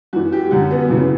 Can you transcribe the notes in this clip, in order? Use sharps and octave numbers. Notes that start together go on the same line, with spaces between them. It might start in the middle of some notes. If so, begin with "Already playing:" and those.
F#2 E3 F#4
G4
F#2 D3 F#3 F#4
B3
F#2 C#3 E3